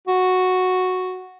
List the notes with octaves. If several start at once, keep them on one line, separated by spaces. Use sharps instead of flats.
F#4